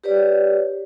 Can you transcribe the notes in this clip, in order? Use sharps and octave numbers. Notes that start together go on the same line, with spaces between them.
G4 B4 C#5 D5